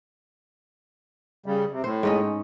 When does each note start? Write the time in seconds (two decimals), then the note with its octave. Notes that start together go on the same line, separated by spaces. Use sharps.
1.46 C#3 G3
1.72 C3
1.84 A2 C5
2.03 G#2 C#4 D#5